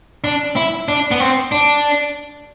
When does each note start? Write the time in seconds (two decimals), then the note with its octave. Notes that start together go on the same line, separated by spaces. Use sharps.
0.24 D4
0.56 E4
0.88 D4
1.11 B3
1.20 C4
1.52 D4